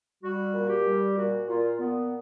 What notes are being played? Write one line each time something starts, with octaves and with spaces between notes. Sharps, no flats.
G3 F#4
A#2
G4
G3
A#2 F#4
A#2 F4
A#2 B3